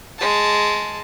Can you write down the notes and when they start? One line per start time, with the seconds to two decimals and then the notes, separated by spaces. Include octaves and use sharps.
0.19 G#3 A5